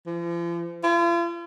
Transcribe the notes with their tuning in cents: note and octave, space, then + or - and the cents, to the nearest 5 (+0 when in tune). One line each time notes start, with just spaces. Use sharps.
F3 -40
F4 -45